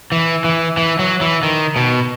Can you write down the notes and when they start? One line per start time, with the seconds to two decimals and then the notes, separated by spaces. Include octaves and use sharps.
0.12 E3
0.44 E3
0.77 E3
0.99 F#3
1.21 E3
1.43 D#3
1.76 B2